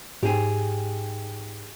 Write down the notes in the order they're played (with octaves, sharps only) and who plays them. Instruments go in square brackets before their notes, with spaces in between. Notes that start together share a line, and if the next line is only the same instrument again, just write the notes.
[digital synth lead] G#2 [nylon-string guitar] G4 G#4